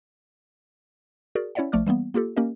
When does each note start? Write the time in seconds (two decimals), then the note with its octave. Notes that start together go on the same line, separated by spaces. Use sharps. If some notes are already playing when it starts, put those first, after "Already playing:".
1.35 F#4 G#4 A#4 D5
1.55 C#4 E4 C#5 D5 E5 F#5
1.72 A#1 F3 A3 D5 D6 F6
1.86 E3 G3 A#3 B3
2.14 A#3 F4 G4 A4
2.36 A#3 C#4 G4 A#4 D#5